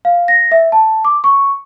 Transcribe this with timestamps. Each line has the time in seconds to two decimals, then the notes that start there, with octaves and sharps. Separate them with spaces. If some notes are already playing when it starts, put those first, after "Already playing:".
0.05 F5
0.28 A#6
0.52 E5
0.72 A5
1.05 D6
1.24 C#6